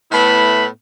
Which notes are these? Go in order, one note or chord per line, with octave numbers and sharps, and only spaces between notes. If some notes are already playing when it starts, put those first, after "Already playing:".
A2 A3 B3 E4 B4 B5